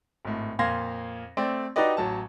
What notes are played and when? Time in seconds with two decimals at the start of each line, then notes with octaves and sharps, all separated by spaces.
0.25 G#1 A2
0.59 F2 A#2 F5 C6 G#6 A#6
1.37 A3 C4 D5
1.76 D#4 F#4 G4 B4 D5 D#5
1.97 A1 F#3 A5